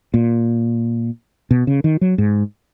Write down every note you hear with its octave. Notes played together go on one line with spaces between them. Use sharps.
A#2
B2
C#3
D#3
F#3
G#2